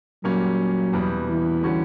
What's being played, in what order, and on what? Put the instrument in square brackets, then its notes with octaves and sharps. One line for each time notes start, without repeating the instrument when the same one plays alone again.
[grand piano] A#2 G3 A#3 C#4 [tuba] F#3
[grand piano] E2 B2 G3
[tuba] E3
[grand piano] D3 G3 C#4 F#4